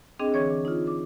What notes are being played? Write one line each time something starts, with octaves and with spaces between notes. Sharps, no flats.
C4 D4 G#4 D#5 G5
D3 E3 C#5 C#6 G#6
D6
D#4 F4
D6